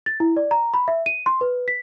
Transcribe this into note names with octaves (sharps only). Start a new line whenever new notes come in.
A6
E4
D5
A#5
B5
E5
D#7
C6
B4
B6